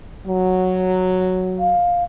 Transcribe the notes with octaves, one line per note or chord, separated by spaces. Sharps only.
F#3
F5